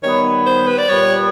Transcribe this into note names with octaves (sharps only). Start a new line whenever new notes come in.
D#3 G3 B3 C#5
C5
B4
D5
A#2 G3 B3 C#5